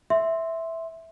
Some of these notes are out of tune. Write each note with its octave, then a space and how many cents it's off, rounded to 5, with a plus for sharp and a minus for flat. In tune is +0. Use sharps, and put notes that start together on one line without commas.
E5 -5 C6 +0